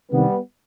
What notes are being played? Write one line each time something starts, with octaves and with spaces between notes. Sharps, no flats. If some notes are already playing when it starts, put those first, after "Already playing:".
C2 C3 D#3 G3 B3